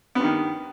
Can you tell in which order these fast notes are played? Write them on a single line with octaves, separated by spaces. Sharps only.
B3 G2 D#3